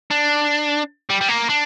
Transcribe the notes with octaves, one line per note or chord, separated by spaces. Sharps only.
D4
G3
G3
A#3
D4